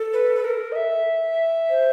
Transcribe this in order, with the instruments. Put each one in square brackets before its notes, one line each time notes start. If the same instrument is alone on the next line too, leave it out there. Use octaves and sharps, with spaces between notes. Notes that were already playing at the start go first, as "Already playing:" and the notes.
Already playing: [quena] A4
[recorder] B4
B4
A#4
D#5
E5
[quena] C5